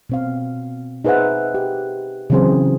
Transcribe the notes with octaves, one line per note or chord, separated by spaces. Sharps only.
B2 C4 F5
D#4 G#4 B4 C5 E5 F#5
G4
C#3 E3 F#3 C4 G#4 C5